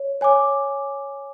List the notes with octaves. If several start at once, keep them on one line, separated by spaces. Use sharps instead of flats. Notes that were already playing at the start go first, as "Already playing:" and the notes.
Already playing: C#5
C#5 G#5 D6